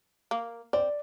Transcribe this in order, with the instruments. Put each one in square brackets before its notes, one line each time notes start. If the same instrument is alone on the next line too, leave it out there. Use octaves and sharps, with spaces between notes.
[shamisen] A#3
[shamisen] C4 [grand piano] D5